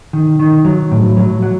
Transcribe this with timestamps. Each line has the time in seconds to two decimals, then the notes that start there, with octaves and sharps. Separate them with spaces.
0.13 D#3
0.39 D#3
0.65 F#3
0.91 A2
1.17 F#3
1.42 F#3